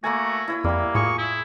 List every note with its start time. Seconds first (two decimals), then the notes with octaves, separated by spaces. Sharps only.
0.04 A3 A#3 F#4 A#4 G#5
0.48 E4 C#5 E6
0.64 F2 G3 A#3 B5
0.95 A2 F4 G#4 C#6
1.18 E4